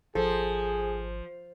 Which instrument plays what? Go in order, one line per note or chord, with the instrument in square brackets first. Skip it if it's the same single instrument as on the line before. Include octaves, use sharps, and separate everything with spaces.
[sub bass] G#1 [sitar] F3 [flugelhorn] G#4 [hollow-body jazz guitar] A4